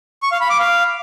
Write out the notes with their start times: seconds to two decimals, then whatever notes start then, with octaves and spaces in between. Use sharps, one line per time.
0.23 C#6
0.32 F5
0.41 B5
0.50 D6
0.59 F5